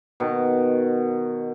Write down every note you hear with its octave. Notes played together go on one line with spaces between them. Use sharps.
B2 D#3